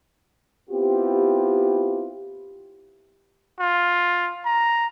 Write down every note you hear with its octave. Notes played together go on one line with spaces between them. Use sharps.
B3 C4 E4 F4 G4
F4
A#5